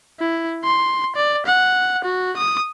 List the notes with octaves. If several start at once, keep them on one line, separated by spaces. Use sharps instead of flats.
E4
C6
D5
F#5
F#4
D#6